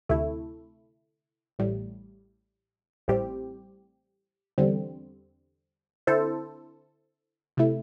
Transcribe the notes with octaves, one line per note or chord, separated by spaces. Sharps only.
D2 C3 A3 E4
A1 A2 G3
A1 A2 G3 C4 G4
E2 D3 G3 C4
D3 C4 E4 A4 C5
C3 A3 E4